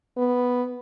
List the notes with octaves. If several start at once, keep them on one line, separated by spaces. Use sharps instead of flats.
B3